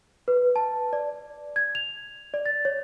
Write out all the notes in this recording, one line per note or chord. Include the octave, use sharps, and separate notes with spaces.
B4
A5
D5
G#6
F7
D5
A6
C#5